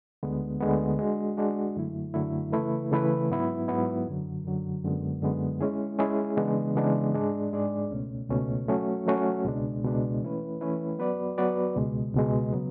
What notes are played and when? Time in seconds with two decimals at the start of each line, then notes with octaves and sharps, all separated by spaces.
0.23 D2 D3 G#3 B3
0.60 D2 D3 G#3 B3
0.99 G#3 D4 F#4
1.37 G#3 D4 F#4
1.76 F#2 D3 F#3 A3 E4
2.14 F#2 D3 F#3 A3 E4
2.52 C#3 E3 A3 E4 B4
2.91 C#3 E3 A3 E4 B4
3.30 G#2 F#3 B3 E4
3.68 G#2 F#3 B3 E4
4.07 F#2 D3 F#3
4.45 F#2 D3 F#3
4.84 F#2 D3 G#3 B3
5.22 F#2 D3 G#3 B3
5.61 G#3 C#4 E4 G#4
5.99 G#3 C#4 E4 G#4
6.37 C#3 E3 G#3 B3 D4
6.75 C#3 E3 G#3 B3 D4
7.14 G#2 G#3 D4 G#4 D5
7.53 G#2 G#3 D4 G#4 D5
7.91 C#2 B2 A3 C#4
8.30 C#2 B2 A3 C#4
8.69 F#3 A3 C#4 F#4
9.06 F#3 A3 C#4 F#4
9.45 C#2 B2 G#3 D4
9.84 C#2 B2 G#3 D4
10.21 E3 A3 C#4 E4 B4
10.61 E3 A3 C#4 E4 B4
10.99 F#3 B3 F#4 B4 D5
11.38 F#3 B3 F#4 B4 D5
11.76 C#2 B2 G#3
12.14 C#2 B2 G#3
12.52 C#3 F#3 B3